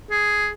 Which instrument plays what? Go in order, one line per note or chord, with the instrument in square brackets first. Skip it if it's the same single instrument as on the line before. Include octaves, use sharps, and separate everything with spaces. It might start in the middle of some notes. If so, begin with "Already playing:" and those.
[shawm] G#4